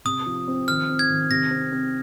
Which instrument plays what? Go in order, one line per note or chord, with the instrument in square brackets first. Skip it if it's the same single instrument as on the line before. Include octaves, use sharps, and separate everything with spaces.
[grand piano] C3 [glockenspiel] D#6
[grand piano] F3
C4
[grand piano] D#3 [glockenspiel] F6
[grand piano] C4
[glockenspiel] G#6
[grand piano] D#3
[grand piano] C3 [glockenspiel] A#6
[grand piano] C4
C4